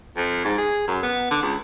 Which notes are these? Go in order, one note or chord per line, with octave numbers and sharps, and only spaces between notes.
F2
G#2
G#4
F#2
B3
D3
C#2